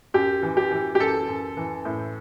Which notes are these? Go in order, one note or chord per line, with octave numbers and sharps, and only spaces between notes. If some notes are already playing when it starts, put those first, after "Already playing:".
F#2 G4
E3
G4
E3
G4
F#2 A4
F#2
E3
A2